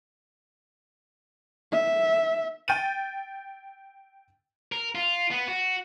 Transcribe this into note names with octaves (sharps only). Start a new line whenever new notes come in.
E5
G5 G6 A6 D#7
A#4
F4
B3
F#4